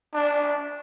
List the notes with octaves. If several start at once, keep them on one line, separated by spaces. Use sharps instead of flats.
D4